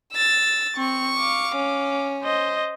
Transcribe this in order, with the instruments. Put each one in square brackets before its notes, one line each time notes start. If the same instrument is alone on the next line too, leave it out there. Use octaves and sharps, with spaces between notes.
[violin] E6 A6
[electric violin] C4 [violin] C#6
[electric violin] F5 D6
[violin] C#4
[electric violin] C5 D#5